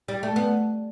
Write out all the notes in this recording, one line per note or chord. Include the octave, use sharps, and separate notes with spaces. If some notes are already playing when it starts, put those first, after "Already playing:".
G3
A3
B3